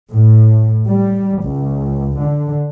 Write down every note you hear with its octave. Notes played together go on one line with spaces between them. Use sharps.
A2
G3
C#2
D3